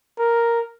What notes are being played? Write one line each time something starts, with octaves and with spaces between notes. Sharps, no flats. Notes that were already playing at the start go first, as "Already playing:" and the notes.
A#4